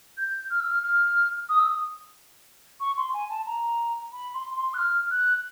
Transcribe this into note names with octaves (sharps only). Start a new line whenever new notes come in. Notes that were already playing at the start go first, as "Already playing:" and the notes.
G6
F6
E6
F6
F6
D#6
E6
D#6
C#6
C6
G#5
A5
A#5
B5
C6
C6
F#6
F6
F#6